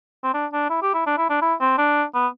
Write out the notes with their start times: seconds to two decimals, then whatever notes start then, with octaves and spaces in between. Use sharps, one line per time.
0.24 C4
0.34 D4
0.53 D4
0.70 E4
0.82 G4
0.94 E4
1.06 D4
1.18 E4
1.30 D4
1.42 E4
1.60 C4
1.78 D4
2.15 B3